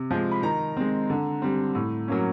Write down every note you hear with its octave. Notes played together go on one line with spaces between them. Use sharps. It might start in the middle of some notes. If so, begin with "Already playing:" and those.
Already playing: C3
F3 G#3
B5
D#3 A#5
G#3 C4
D3
G3 C4
A2
F#3 A#3 C#4